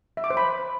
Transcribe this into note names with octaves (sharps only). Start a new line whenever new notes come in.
E5
D6
C5
B5